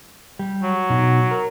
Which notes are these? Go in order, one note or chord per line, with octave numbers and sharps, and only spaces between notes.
G3
F#3
B2 D#4
A#4